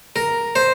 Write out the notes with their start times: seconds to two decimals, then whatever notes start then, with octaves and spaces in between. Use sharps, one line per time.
0.16 A#4
0.56 C5